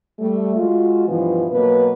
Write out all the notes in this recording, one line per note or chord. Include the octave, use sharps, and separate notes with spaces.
G3 A3
G#3 F4 F#4
G2 B2 E3 F3
B2 F#3 A#3 B4